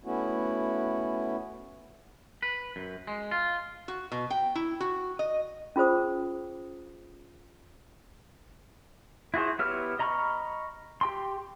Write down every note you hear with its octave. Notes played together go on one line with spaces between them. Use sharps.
A3 B3 C#4 E4 F#4
B4
F#2
G#3
F4
F#4
B2
G5
E4
F#4
D#5
C#4 F4 G#4 C5 D#6
E4 F#4 G#4 C5
B3 E4 G4 C#5 F6
D#5 A#5 B5 C#6 F6
G4 G5 C6